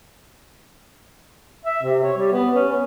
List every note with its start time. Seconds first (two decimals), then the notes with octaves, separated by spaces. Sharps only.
1.65 E5
1.83 C3
2.03 C#5
2.17 G3
2.32 B3
2.55 C#4
2.72 B3